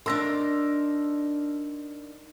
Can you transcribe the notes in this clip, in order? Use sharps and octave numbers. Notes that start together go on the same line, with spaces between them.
D4 D#4 A#4 C6 E6 A#6